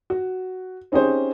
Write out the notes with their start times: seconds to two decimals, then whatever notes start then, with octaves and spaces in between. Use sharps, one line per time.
0.10 F#4
0.92 C4 C#4 D#4 G4 G#4 C5